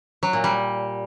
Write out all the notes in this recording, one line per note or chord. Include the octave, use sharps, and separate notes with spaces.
F#3
A#2
G3